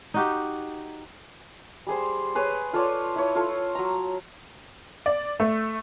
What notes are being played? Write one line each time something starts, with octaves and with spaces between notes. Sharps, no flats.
D#4 F#4 G4
G3 G#4 C5
G#4 B4 C#5
F4 A4 C#5 D5
E4 C#5
F4 A4
F#3 A#5
D5
A3